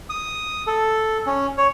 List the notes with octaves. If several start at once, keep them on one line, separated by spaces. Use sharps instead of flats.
D#6
A4
C#4
C#5